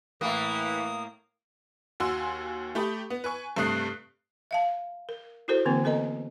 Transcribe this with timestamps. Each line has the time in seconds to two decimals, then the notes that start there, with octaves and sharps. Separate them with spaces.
0.21 A2 E3 A#3 D#6
2.00 D#2 F#4 G#5 C6 E6
2.75 A3 G4 B5 D#6
3.10 B3
3.24 B4 G#5 C#6
3.56 G2 C3 A3 D#6 F#6 C7
4.51 E5 F5 A5
5.09 A#4
5.48 E4 F#4 A4 A#4 C5
5.65 D3 E3 A#3 C4 B4
5.84 B3 A4 B4 D#5 A#5